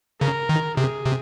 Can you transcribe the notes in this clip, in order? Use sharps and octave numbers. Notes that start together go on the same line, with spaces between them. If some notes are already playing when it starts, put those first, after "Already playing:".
C#3 A#4
D#3
C3 G#4
C3